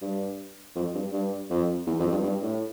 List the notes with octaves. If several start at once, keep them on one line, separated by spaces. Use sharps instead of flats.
G2
F2
G2
G2
F2
E2
F2
G2
G2
A2